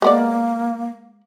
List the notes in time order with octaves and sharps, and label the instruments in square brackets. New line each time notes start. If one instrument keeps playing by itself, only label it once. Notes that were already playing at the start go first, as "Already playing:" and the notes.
[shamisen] G#3 B3 D5 [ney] A#3